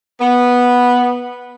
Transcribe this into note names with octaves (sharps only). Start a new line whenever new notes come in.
B3